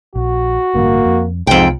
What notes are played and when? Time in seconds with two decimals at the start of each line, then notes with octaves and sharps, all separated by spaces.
0.15 A#1 F#4
0.75 A1 G2 D3 A#3
1.05 F2
1.47 C2 F2 G#2 G5